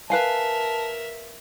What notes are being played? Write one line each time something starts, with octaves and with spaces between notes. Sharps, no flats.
A#4 B4 E5 F5 G#5 A5